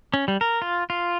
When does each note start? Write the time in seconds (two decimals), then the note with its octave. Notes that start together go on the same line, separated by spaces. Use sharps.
0.14 C#4
0.28 G3
0.41 A#4
0.62 F4
0.90 F4